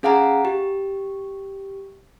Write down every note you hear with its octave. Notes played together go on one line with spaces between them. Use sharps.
C#4 G#4 F5 F#5 G#5 A#5
G4